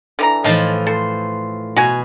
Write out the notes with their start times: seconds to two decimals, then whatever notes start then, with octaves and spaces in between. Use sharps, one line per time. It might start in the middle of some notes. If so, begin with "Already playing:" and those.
0.19 D3 E3 A#5
0.44 A2 E3 F3 D#4 F5 A5
0.87 A4 C5
1.77 B2 F#4 G#5